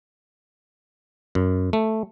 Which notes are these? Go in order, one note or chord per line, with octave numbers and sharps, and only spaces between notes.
F#2
A3